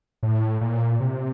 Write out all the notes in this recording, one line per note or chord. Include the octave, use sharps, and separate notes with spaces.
A2
A#2
C3